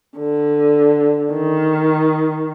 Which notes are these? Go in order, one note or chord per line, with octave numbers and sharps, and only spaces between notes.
D3
D#3